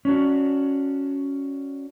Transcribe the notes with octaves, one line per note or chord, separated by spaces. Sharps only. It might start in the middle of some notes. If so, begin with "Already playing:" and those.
C#4 D4 F#4